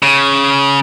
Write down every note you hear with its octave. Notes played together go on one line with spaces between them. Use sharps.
C#3